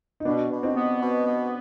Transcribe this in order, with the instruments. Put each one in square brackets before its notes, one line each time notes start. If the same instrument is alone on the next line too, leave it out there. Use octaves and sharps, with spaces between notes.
[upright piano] D#4
[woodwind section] B2 [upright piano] B3 D4
[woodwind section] B2
[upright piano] C4 D#4
[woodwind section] B3
B2
B3